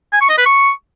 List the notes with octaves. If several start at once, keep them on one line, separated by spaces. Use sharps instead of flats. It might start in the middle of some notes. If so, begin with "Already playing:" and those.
G#5
C#6
D#5
B4
C#6